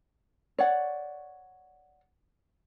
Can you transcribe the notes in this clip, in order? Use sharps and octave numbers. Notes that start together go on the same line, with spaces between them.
C#5 D5 F#5